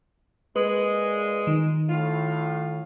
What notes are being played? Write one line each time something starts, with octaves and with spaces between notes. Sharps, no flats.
A#2 G#3 B4
D#3
A2 F4